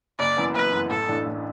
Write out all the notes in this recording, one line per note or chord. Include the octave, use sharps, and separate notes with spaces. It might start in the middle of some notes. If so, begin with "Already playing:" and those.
F#1 D5
F#2 E3 B3
F#1 B4
F#2 E3 B3
A1 A4
A2 E3 D4
A1